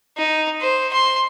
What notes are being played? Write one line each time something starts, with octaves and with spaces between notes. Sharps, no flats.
D#4
C5
C6